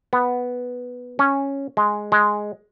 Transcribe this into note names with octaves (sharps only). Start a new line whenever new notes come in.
B3
C#4
G#3
G#3